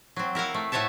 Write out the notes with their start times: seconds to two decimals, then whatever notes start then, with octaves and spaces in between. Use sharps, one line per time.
0.16 F#3 C4
0.35 E4 A#4 F5 F#5
0.54 A3
0.72 A2 A3 F#4 C#5 E5 A5